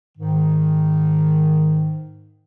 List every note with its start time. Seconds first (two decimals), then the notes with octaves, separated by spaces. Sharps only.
0.18 G#2 D#3